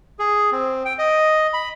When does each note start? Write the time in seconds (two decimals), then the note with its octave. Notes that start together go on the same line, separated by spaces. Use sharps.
0.19 G#4
0.52 C4
0.85 G5
0.99 D#5
1.53 B5